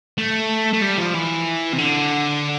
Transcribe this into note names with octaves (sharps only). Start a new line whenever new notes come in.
A3
A3
G3
F3
E3
C3
D3